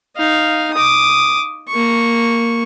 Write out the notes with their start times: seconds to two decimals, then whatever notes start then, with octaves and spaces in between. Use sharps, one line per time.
0.16 D#4 F5
0.74 D6 D#6
1.69 A#3 C#6